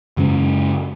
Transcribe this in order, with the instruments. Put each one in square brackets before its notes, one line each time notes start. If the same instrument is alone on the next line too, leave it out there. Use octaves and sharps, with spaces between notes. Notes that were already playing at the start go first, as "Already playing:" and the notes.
[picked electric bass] F#2 C#3 G#3 C#4